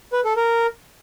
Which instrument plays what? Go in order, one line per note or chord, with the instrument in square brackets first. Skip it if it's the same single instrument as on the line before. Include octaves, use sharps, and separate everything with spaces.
[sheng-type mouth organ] B4
A4
A#4